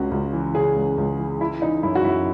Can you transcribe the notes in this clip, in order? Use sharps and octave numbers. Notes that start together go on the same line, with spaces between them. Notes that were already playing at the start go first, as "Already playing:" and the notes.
Already playing: C#2 C#3 F#4
C#2
E3
C#3 G#4
C#2
C#2
E3
E3 E4
E3 D#4
F#2 E4
F#4
F#2 E4